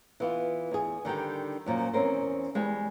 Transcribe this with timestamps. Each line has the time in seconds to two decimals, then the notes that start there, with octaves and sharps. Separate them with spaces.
0.20 E3 B3 F4
0.71 E2 G#4
1.05 D3 D#3 G3 G4
1.66 F#2 A#2 F3
1.93 E2 C4 C#4 A#4 C5
2.55 E2 G3 G#3